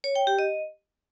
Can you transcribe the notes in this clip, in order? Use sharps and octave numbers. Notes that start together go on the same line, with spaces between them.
C#5
G5
G4
D#5